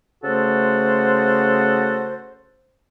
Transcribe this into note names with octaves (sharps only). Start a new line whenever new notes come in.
C#3 A3 F#4 A4 C5